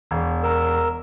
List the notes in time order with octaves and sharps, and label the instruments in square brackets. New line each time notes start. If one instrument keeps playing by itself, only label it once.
[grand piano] E1
[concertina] A#4 E6